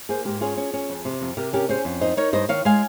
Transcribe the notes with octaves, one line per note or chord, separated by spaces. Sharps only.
A#3 G#4 C5
G#2 G4 A#4
C#4 F4 G#4
C#4
C#4
F2
C3
F2
C3 G4 A#4
C#4 G4 A#4
C#4 G#4 C5
F2
D#4 C5 D#5
D#4 A#4 C#5
G2 C5 D#5
D#3 C#5 F5
G#3 F5 G#5